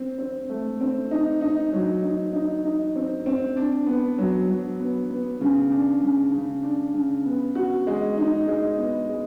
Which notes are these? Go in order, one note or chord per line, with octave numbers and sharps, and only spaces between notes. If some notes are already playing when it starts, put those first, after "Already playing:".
Already playing: C4
C4
A3
C4
D#4
D#4
F#3
D#4
D#4
D#4
C4
C4
D4
B3
F#3
F#3
B3
B3
C#3
D4
C#3
C#3
D4
C#3
B3
F#4
G#3
D#4
G#3
B3
G#3